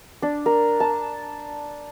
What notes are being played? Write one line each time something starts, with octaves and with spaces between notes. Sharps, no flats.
D4
A#4
A5